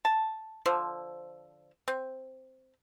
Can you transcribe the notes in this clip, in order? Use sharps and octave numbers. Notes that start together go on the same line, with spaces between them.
A5
D3 F3 C5
C4